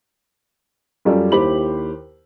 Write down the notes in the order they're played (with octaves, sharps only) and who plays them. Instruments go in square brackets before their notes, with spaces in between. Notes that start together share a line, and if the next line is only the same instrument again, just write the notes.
[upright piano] F#2 G3 F4 A4 D5
D#2 E4 G4 C5 B5 F#7